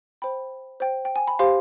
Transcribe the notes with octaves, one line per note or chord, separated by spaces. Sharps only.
C5 G5 B5
C5 G5
G5
G#5
B5
G4 C5 F5 C6